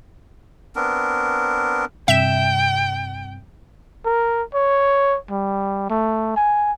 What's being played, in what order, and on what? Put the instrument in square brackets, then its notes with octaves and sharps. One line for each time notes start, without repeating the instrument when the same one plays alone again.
[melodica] B3 C4 D4 A#4
[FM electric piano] G2 C3 [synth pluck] E5 E7 [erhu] G5
[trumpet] A#4
C#5
G3
A3
G#5